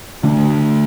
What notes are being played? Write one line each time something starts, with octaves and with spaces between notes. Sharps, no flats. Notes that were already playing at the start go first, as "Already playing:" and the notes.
D3 A3 D4